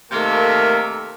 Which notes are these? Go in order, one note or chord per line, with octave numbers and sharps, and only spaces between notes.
C3 D#3 A3 A#3